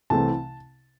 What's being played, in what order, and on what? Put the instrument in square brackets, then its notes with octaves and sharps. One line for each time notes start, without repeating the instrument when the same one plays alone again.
[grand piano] C2 C3 E3 A3 C4 A5